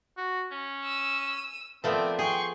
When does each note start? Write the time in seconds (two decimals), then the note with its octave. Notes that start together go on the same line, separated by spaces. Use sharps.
0.17 F#4
0.51 C#4
0.85 E6 D#7
1.84 F3 A3 B3 C4 A#4 D5
2.19 G#4 G5 C6 C#6